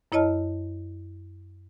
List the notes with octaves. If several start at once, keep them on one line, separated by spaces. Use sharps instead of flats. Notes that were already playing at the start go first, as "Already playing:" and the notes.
F#2 E4 C#5 D#5 A5 F6